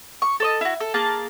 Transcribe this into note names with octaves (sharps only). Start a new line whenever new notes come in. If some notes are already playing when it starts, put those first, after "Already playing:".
C#6
A4 C#5 D#5
E4 F#4
A4
A#3 G#4 A5